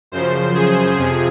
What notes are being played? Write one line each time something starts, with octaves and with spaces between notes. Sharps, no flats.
F#2 C#3 F3 C5
G#4
F2 C3 F3